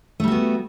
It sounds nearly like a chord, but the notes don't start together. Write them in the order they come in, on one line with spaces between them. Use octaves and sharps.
A3 G3 F#4 B3